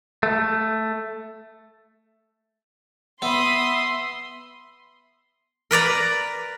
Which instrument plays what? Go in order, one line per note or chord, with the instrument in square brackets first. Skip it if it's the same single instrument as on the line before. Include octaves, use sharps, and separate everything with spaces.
[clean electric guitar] A3
[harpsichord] B3 [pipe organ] E5 [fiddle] B5 D#6 [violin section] C6
[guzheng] A#4 B4 D5 A#5